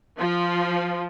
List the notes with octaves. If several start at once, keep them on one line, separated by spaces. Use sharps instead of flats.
F3